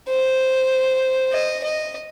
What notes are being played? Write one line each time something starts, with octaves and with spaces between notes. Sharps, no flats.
C5
D#5
D#5